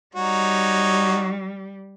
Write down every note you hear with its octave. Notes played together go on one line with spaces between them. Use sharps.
G3 D#4 F#4 C#5